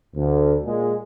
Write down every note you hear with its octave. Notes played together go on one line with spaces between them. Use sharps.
D2
A#2 G#3